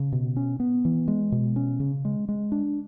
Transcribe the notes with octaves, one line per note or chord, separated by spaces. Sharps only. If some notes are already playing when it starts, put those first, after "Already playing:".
Already playing: C#3
B2
C#4
B3
E3
G#3
B2
C#4
C#3
G#3
G#3
D4